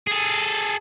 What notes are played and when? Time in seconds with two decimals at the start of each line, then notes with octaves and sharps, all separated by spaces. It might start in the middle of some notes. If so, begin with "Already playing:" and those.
0.07 G#4 A4